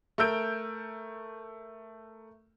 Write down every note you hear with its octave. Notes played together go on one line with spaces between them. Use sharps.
A3 A#4 E6 G6 D7